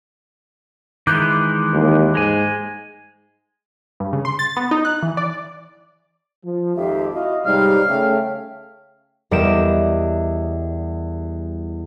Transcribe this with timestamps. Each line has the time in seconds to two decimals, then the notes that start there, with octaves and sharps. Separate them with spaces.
1.07 D#3 E3 G#3 D6 F#6 G6
1.73 D#2
2.15 G#2 G#3 G#5
4.00 G2
4.13 C#3
4.25 C6
4.39 A6
4.57 B3
4.71 D#4
4.85 F#6
5.03 E3
5.17 D5
6.45 F3
6.76 G#1 F2 D#4 G4 E5 F5
7.14 E4 F#4 D#5 F5
7.46 G#2 C3 G3 D#4 C#5 F5
7.87 C#3 A3 C#5 E5 G5
9.31 E2 G3 A#4 D#5 D7 E7